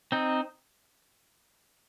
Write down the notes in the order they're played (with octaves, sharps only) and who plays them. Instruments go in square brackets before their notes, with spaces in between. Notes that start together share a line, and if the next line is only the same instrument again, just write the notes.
[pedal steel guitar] C4 D#4